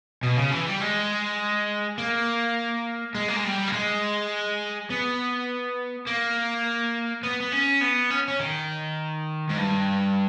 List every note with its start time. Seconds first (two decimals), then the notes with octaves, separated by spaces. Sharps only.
0.23 B2
0.37 C#3
0.52 E3
0.67 G3
0.81 G#3
1.98 A#3
3.15 G#3
3.28 A#3
3.36 G#3
3.44 G3
3.68 A#3
3.73 G#3
4.90 B3
6.07 A#3
7.23 B3
7.41 B3
7.52 C#4
7.81 B3
8.11 C#4
8.28 C#4
8.40 D#3
9.49 G#2
9.57 G2